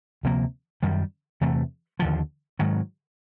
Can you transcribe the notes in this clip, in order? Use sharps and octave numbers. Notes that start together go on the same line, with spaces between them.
D2 C3 F3 A#3
F#2 D#3 G3
E2 C3 E3 A3
D#2 D3 F3
G#2 D#3 F#3